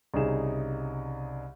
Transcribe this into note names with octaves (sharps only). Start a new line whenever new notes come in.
C2 C#3 D#4 G#4 E7